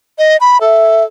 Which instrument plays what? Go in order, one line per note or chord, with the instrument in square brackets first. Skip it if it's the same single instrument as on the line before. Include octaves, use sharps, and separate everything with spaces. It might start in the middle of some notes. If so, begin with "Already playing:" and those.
[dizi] D#5
B5
[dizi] A4 [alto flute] E5